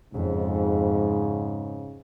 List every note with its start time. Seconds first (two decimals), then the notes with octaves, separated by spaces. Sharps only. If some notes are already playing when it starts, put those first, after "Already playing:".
0.13 F2 G#2 C#3